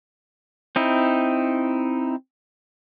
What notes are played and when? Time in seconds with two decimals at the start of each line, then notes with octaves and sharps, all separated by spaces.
0.76 C4 D#4 E4